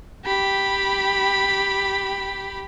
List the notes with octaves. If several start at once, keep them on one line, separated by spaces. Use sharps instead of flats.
G4 B5